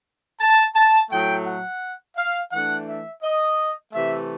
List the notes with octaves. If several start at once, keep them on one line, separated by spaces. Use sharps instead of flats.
A5
A5
A2 F#3 A3 G5
F#5
F5
E3 A3 D4 F#5
E5
D#5
C3 E3 A3 E5